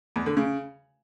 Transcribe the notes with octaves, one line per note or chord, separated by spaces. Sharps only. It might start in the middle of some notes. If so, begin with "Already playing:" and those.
E2
D3
C#3